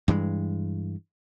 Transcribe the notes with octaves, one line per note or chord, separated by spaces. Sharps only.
G2 E3 G#3